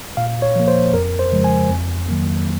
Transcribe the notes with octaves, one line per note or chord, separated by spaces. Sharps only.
A#2 F5
C#5
F3 A#3
C5
F2 A#4
C5
C#3 F3 G#3
G#5
F2
D#3 F#3 A#3